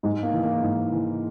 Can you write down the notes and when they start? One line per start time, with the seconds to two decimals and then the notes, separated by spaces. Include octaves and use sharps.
0.03 G#2 G#3
0.23 A#3
0.33 E3
0.43 A#3
0.63 G#2
0.92 E3